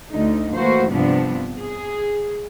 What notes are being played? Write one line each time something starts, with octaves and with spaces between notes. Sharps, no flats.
D2 D3 D#4
E3 A3 A#3 F#4 C5
G2 C3 F3 B3 D4
G#4